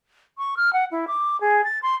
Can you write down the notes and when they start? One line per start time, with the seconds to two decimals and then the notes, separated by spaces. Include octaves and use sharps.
0.38 C#6
0.57 F6
0.73 F#5
0.91 E4
1.08 D6
1.41 G#4
1.64 A6
1.82 C6